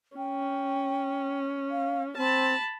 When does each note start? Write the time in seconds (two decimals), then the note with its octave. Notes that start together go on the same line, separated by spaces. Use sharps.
0.17 C#4 G5
1.71 F5
2.17 C4 A5 B5